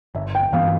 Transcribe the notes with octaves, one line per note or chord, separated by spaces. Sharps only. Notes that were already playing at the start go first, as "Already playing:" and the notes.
G1 E5
G5
G2 E3 B3 F5